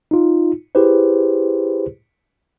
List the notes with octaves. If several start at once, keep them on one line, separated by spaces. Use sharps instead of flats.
D#4 F4
E4 G4 G#4 B4 C5